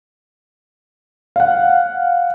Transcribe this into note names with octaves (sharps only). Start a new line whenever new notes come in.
F5 F#5